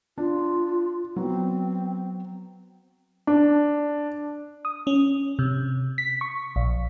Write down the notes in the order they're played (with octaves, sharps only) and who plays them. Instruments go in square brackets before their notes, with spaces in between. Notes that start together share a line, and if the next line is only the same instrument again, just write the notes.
[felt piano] D4 [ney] F4
[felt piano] F#3 B3 [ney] C4
[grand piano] D4
[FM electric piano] D#6
C#4
C3
B6
C#6
A#1